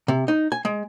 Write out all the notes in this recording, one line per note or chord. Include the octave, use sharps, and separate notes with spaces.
C3
D#4
G#5
G#3